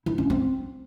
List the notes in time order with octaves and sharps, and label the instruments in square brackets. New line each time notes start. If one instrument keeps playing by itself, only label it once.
[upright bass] E4
C#4
C4